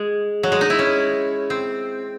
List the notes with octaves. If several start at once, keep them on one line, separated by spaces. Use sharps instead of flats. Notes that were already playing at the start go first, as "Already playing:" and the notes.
Already playing: G#3
F#3
G#3
D#4
E4
C#4
C4